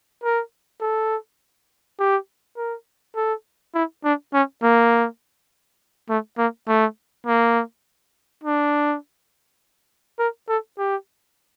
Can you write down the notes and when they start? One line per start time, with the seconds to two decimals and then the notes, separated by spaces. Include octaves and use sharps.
0.23 A#4
0.81 A4
1.99 G4
2.57 A#4
3.16 A4
3.74 E4
4.04 D4
4.34 C#4
4.63 A#3
6.09 A3
6.38 A#3
6.68 A3
7.26 A#3
8.43 D4
10.19 A#4
10.48 A4
10.78 G4